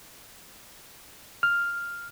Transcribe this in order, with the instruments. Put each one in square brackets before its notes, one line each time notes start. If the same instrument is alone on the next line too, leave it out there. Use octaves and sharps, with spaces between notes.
[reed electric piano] F6